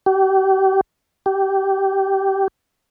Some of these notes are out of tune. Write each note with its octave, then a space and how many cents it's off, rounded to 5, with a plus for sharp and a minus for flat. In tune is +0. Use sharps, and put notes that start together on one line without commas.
G4 -35
G4 -15